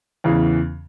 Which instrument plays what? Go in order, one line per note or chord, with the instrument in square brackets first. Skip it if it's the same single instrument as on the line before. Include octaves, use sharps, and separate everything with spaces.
[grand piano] E2 C#3 E3